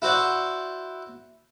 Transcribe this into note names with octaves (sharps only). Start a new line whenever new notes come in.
E4 F#4 C5 D5 F#5